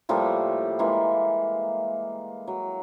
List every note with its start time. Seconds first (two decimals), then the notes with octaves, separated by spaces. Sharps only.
0.09 A2 F3 G3 A#3
0.79 E3 G#3 A#3
2.47 F#3